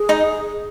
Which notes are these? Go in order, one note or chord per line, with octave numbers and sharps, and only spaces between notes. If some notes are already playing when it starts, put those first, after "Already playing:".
Already playing: G#4
D#4 D#5